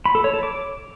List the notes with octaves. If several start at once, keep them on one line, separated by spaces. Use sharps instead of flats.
B5
A4
C#5
A4
D6